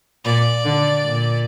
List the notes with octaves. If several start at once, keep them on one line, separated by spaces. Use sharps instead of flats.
A#2 D5
D3
A#2